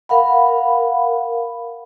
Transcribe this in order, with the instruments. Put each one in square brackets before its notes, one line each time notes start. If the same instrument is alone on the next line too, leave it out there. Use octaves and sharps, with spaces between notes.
[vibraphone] A#4 F5 F#5 B5